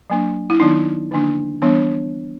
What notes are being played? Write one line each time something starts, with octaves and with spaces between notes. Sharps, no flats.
F#3 A#3 D4
E4
D#3 F#3 B3 D4 D#4
D3 F3 A#3 D4
E3 G3 B3 D4